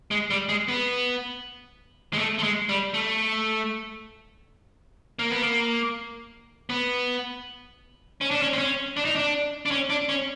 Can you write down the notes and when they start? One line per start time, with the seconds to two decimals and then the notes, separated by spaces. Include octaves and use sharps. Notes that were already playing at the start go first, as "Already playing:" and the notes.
0.11 G#3
0.30 G3
0.49 G#3
0.68 B3
2.13 G#3
2.19 A3
2.39 A3
2.43 G#3
2.69 G3
2.94 A3
5.19 A#3
5.30 B3
5.42 A#3
6.70 B3
8.21 C#4
8.31 D4
8.42 C#4
8.53 C4
8.58 C#4
8.97 D4
9.05 D#4
9.16 D4
9.66 D4
9.71 C#4
9.90 D4
10.09 C#4